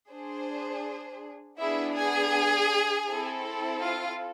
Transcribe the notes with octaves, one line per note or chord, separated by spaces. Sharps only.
D4 G#4 C5
B3 D4 E4 G#4 E5
G#4 G#5
C4 E4 A4
F4 F5